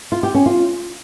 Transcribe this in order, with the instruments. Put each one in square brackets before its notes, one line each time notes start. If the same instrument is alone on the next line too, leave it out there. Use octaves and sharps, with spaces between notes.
[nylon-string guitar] F4
G4
C#4
F4